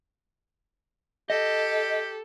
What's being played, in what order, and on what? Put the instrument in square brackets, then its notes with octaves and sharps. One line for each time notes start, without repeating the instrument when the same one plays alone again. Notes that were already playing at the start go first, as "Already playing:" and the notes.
[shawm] G4 [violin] A4 [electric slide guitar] D#5